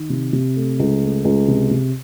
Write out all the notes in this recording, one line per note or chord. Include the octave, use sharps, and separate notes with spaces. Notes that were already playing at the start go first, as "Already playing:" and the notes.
Already playing: D#3
C3
C3
A3
C#2
A3
C#2
C3
C3